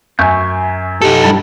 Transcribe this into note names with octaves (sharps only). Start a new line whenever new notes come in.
F#2 E5 G#5 C#6 G6
D#4 G4 A4
G2 G3 E4 A5